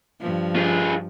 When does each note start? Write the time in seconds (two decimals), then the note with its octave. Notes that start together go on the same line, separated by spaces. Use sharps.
0.20 G2 F3
0.56 F4 G#4